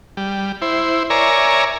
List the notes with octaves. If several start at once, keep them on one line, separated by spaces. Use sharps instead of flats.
G3
E4 C5
A#4 C#5 D5 E5 G#5 A#5